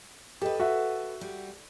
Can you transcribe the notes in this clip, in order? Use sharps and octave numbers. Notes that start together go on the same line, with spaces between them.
G4 A4 B4 D#5
F#4 E5 F#5
G3